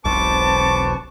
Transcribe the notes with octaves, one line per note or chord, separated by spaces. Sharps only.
E1 B1 C4 B4 A5 C#6 D6